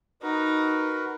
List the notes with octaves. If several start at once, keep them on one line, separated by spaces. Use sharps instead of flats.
D#4 F#4 A#4 B4